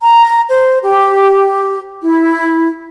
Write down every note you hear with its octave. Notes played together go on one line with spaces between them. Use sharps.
A#5
C5
G4
E4